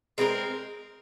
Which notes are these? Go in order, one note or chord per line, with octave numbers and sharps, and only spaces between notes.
G#3 C4 F4 A#4